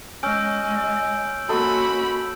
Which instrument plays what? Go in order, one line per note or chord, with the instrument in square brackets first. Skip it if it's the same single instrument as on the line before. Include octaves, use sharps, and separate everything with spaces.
[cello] G#3 D#5 [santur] C#4 [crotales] E6 G6 D7
[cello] A#3 C#4 [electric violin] F#4 B5 [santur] A4 D#5 C6